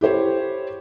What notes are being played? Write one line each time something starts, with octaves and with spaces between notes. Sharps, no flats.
E4 G4 C5 C#5